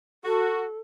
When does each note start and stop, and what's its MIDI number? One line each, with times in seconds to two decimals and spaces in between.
0.25 0.64 66
0.25 0.79 69